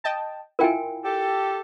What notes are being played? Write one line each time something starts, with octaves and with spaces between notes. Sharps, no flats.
D#5 G5 A5
E4 F4 A#4 G5 G#5
G4 A4